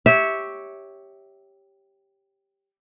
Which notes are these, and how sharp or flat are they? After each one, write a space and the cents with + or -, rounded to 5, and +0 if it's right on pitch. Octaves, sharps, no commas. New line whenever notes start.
G4 +0 C#5 +0 E5 -15